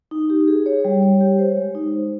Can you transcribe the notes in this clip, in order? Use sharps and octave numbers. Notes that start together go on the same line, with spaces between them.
D#4
G4
G#4
C#5
G3
C#5
G4
C5
G#3
D#4
C5